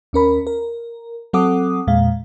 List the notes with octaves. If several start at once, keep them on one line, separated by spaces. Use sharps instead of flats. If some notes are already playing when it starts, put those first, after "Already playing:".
D#2 C#4 A#4 B5
A#4
F#3 C4 A4 F#5 D6 D#6
E2 A#2 G#3 F5